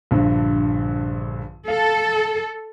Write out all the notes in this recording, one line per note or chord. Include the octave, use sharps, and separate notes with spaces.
A#1 G2 D3
A4 F5